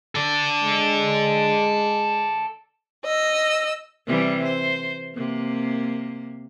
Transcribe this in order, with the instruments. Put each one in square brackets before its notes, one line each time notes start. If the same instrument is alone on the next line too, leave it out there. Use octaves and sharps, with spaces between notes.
[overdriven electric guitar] A4 D5
[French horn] G#3
[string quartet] D#5 E6
[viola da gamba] C3 E3 G3
C5
C3 A#3